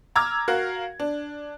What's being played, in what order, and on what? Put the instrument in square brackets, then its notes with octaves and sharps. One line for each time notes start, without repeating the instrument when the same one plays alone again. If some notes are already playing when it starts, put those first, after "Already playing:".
[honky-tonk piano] A#5 D6 E6 F6 G#6
F#4 A#4 F5
D4